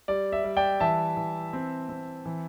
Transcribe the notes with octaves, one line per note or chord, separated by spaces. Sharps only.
G3 D5
E5
G3
D5 G5
E3 E5 A5
E3
C4
C4
E3